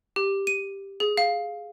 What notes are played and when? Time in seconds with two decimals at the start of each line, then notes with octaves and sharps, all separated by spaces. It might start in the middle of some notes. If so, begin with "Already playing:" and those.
0.16 G4
0.47 D#7
1.00 G#4
1.17 F5